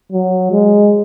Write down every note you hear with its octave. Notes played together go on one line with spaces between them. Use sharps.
F#3
G#3